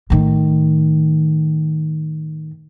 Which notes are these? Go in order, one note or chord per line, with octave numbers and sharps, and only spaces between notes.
A2 D#3